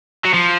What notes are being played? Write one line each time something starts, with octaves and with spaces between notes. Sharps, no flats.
F#3
F3